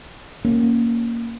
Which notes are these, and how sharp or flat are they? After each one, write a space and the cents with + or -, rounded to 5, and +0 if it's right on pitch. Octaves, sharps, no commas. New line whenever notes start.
A#3 -5 C#4 +0